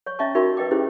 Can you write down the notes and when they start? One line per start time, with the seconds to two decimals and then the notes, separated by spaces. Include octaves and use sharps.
0.06 C#5 C#6
0.19 C#4 D#5 E5 A5 A#5 C#6
0.35 D#4 F#4 A#4 E5 B5 C#6
0.57 B4 D#5 G5 D6
0.71 C#4 E4 G4 G#4 C5